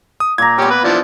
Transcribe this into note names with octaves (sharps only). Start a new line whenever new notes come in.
D#6
A#2 A#5 G#6
B3 C#4 G4 D6
B4
E3 F3 D4